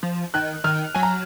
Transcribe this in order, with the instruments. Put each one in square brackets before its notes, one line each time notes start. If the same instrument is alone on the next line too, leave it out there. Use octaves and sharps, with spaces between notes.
[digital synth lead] F3
[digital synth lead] D#3 [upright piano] F#6
[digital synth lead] D#3 [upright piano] F6
[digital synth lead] F#3 [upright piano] G#5
[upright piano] A#5